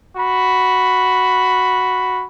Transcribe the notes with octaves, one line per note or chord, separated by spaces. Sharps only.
F#4 B5